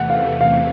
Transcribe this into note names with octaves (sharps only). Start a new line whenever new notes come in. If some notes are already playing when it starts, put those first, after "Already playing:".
Already playing: E2 C3 E3 A3 F#5
F5
F5